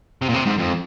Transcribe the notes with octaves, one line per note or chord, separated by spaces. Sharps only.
C3
A#2
C3
G#2
F2